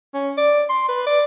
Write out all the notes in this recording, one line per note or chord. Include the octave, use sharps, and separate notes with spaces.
C#4
D5
C6
B4
D5